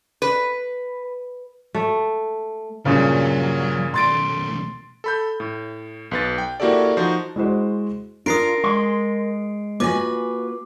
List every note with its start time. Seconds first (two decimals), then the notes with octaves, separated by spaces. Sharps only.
0.22 B4
1.75 A3
2.85 G2 A#2 C#3 F#3
3.94 B1 A3 C6 A6 D7
5.04 A4 B5 G6
5.40 A2
6.11 B1 B4 A6
6.38 G5
6.60 A#3 E4 F#4 G4 A4 D5
6.97 F3 D#4 F#4 C5
7.36 G#3 E4 F#4 C5 D#5
8.26 D4 F4 A#4 D#6 C7 D7
8.64 G#3 C6
9.80 A#3 F4 F#4 B4 G#5 D6